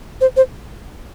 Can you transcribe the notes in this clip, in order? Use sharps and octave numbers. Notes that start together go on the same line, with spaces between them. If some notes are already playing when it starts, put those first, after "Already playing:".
C5
C5